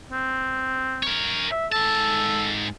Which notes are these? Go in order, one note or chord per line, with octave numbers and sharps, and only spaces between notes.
C4
A#4 C#5
E5
G#2 A4 A5